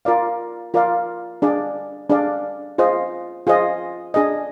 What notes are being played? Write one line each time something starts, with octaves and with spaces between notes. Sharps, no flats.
F4 A#4 D5 F5
F4 A#4 D5 F5
D4 G#4 D5 F5
D4 G#4 D5 F5
F4 G#4 C5 D#5
F4 G#4 C5 D#5
D4 G#4 D#5